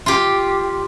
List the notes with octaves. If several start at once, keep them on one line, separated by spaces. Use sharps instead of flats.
F4 G4